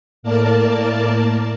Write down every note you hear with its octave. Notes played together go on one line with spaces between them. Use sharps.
A2 A#3 A#4 D5 A5